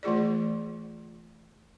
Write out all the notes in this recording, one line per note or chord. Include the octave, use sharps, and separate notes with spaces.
E3 A3 F4 G#4 D5